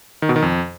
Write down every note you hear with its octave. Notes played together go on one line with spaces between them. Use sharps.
D#3
B2
D#3
F2